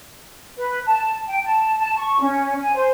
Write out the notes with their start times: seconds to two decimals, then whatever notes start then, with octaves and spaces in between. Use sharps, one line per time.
0.57 B4
0.85 A5
1.27 G5
1.44 A5
1.79 A5
1.97 C#6
2.20 C#4
2.59 G#5
2.75 C5